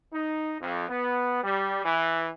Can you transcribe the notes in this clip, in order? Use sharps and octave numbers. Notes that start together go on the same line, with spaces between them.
D#4
F2
B3
G3
E3